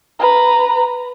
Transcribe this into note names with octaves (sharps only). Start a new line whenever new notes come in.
B4 A#5